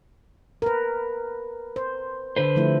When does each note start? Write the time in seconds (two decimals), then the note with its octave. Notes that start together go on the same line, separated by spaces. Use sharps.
0.62 A#4 B4
1.76 C5
2.37 D3 B4 C5
2.56 F3 A3 E4